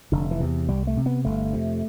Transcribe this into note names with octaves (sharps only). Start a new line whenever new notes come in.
F1 D3
E3
E2 C3
C2 G3
A3
C3
B3
G1 A3
F2 C3